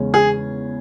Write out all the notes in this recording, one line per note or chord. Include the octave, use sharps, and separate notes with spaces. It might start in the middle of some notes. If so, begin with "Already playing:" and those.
Already playing: E2 C#3 G#3 C#4
G#4